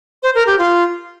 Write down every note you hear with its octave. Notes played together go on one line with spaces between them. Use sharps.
C5
A#4
G4
F4